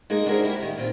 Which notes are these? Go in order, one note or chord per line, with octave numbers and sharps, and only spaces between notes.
G#3 A#3 D#4 G#4 A#4
C#4 D4 F#4 G#4 A#4 C5
A#3 E4 G4
D#3 G4
A#2 C4 F4